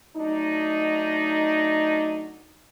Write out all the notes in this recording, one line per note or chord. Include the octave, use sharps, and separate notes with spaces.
F#3 A3 D4 D#4